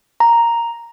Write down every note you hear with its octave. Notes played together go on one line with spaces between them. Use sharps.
A#5